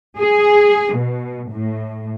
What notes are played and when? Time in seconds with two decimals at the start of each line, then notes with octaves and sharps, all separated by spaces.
0.18 G#4
0.96 B2
1.51 A2